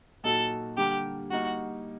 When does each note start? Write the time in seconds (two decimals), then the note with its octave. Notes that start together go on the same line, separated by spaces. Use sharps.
0.23 A#2 F#3 A#3 D#4 F#4 A4
0.77 D3 G3 A#3 G4
1.31 G3 A#3 D#4 F#4